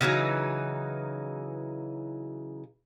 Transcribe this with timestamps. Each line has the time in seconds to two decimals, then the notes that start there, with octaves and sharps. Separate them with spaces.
0.01 C#3 E3 F#3 D#4